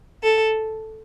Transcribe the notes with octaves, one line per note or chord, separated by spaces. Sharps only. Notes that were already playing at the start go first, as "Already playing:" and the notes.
A4